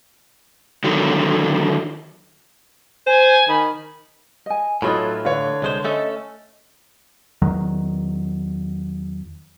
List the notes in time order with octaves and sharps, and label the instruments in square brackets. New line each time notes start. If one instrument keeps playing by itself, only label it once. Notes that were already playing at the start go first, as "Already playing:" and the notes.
[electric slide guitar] D3 D#3 F#3
[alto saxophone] C5 [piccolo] G#5
[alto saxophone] D#3 [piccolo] B5
[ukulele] D#5 G#5
[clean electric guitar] A2 E3 [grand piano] F#3 F4 A4 [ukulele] D#4 C#5 B5
[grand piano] D3 C#5 [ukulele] B4 F5
[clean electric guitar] C2 G#3 C5
[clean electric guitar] A3 C#4 A4 [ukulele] D#5
[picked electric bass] E2 D#3 F#3